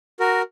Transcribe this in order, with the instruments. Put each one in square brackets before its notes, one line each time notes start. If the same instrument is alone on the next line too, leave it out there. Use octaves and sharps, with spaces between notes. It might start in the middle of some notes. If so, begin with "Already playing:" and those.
[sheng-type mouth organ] F#4 A#4